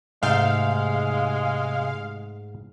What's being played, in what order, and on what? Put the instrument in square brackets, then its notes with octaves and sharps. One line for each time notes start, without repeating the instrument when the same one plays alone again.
[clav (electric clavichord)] G#2 A3 G5 [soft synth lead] C3 [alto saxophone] G#3 [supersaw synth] F5